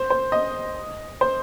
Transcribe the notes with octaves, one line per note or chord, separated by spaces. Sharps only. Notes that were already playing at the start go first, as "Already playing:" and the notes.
Already playing: C5
C5
D#5
C5